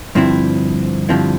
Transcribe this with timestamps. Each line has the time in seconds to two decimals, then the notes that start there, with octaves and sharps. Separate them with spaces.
0.15 G2 D3 F3 C4 E4
1.09 G2 D3 F3 C4 E4